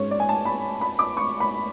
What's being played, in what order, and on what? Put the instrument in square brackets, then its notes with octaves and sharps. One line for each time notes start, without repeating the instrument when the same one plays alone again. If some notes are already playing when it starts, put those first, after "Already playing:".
Already playing: [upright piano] G#2 G#3 C#4 C#5
D5
G#5
A5
B5
B5
D6
C#6
B5